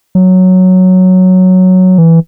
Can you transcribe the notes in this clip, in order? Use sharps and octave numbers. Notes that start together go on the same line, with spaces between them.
F#3
E3